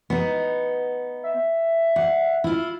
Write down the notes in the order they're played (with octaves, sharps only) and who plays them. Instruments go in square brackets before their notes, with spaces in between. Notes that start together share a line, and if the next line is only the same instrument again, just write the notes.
[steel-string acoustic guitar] B3 D#4
[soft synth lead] E5
[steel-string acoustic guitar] F#5
E4 F4